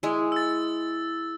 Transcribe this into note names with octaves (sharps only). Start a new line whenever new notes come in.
G#3 E4
E6 A6